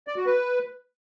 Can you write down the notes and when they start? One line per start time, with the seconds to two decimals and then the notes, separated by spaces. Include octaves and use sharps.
0.07 D5
0.17 F#4
0.26 B4